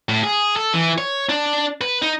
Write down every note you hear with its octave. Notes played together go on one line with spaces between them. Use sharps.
A2
G#4
A4
E3
C#5
D4
B4
D#4